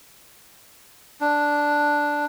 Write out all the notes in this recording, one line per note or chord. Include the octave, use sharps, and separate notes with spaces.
D4